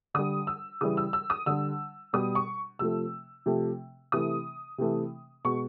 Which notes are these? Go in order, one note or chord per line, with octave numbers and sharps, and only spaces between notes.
D3 G3 D#6
E6
C#3 E3 G3 D#6
E6
E6
D#6
D3 G3 E6
B2 G3 D#6
C#6
C3 F3 A3 E6
C3 F3 A3
C3 E3 A3 D#6
C3 E3 A3
B2 G#3 C#6